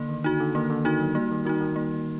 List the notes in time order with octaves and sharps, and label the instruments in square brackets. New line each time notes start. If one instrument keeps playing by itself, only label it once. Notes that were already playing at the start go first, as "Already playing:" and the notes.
Already playing: [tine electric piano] D3 [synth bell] A#3
[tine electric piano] D#3
[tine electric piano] D3 [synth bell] D#4 F#4
[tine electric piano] D3
[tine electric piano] D#3 [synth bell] A#3
[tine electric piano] D3
[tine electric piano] D#3 [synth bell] D#4 F#4
[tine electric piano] F#3
[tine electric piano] G3 [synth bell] A#3
[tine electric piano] D#3
[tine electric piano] D#3 [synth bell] D#4 F#4
[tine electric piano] D#3
[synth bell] A#3